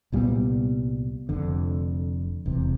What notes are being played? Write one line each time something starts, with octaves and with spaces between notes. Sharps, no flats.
C2 A#2 G3 B3
F1 F2 D3
E1 E2 C3